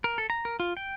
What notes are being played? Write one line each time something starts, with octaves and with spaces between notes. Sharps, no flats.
A#4
A4
A#5
A#4
F4
G5